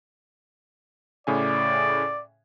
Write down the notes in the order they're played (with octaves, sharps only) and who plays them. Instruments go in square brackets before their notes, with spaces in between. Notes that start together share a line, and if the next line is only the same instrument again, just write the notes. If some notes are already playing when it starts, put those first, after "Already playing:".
[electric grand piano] A2 C#3 G#5 [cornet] D5